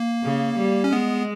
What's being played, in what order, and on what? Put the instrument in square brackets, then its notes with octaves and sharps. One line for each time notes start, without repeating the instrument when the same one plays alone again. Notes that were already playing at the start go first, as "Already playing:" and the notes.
Already playing: [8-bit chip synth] A#3
[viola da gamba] C#3
G3
[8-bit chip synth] C#4
[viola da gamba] G#3 [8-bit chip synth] B3